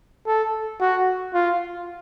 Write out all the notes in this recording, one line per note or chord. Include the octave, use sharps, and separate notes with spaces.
A4
F#4
F4